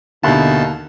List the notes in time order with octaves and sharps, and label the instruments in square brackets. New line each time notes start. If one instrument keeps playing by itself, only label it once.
[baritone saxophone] D#2 [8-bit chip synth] B2 A5 [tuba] D3 [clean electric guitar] E4